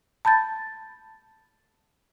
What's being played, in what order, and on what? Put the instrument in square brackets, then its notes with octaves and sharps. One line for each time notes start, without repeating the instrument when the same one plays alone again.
[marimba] A5 B5 G6 A6